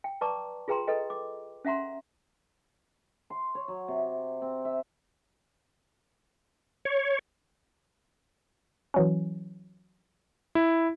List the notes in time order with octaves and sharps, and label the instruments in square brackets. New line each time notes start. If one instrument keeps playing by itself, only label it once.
[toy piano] G5
B4 D5 A5 A#5 C#6 D6
F4 G#4 B4 G5 A#5 C6
A4 B4 D#5 G5
D6
C#4 E5 F#5 A#5 C6
[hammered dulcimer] C6
C#5
F#3
C3
C4
E5
[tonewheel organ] C#5
[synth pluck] E3 F#3 C#4
[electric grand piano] E4